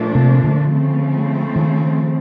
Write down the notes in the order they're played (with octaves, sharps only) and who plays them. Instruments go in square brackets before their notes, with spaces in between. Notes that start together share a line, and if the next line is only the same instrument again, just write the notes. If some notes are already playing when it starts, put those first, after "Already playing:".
Already playing: [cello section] A#2 F3 A3 D4
[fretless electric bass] C3
D3
[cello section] C#3 F3 A3 C4
[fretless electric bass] D#3